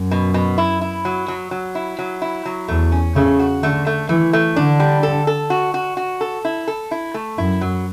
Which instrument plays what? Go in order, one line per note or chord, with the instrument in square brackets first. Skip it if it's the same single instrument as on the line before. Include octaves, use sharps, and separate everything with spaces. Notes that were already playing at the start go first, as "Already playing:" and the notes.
Already playing: [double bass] F#2
[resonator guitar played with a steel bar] B2
B2
E4
E4
F#3
F#3
F#3
E4
F#3
E4
F#3
[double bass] E2 [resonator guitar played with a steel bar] A3
[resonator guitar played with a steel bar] C#4
[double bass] C#3 [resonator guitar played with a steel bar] A3
[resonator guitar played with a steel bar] F#4
[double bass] D3 [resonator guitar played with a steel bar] A3
[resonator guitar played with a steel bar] A3
[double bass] E3 [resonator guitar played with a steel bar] A3
[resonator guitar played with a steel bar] A3
[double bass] D3 [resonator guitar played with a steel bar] D4
[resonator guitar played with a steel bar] G3
A4
A4
F#4
F#4
F#4
A4
E4
A4
E4
A3
[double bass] F#2 [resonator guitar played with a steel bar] E4
[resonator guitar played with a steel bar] F#3